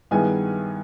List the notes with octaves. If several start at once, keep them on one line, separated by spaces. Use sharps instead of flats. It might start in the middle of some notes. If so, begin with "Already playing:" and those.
G2 D#3 G#3 B3 E4 G#5